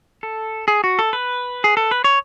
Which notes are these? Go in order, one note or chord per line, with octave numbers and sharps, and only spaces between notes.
A4
G#4
F#4
A4
B4
G#4
A4
B4
C#5